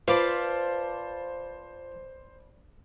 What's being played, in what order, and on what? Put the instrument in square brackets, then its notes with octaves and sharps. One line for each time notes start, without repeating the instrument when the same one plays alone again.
[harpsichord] F4 [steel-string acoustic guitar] B4 D5 A5 [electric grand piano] C5 [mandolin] F5 D6